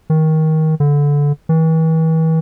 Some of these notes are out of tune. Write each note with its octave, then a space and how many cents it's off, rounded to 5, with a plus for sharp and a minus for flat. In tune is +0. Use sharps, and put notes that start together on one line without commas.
D#3 +20
D3 -20
E3 -40